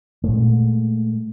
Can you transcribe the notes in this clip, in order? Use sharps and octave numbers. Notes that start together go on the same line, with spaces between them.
A#2 G#3 A3